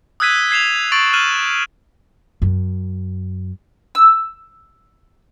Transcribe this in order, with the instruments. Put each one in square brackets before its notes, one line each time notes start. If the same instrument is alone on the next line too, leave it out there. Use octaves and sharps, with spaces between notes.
[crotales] D#6 E6 F#6 G#6 B6 D#7
G#6 C7 E7 F7
C#6 A6 D7 F#7
F6 F#6 D#7 E7 F#7
[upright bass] F#2
[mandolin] E6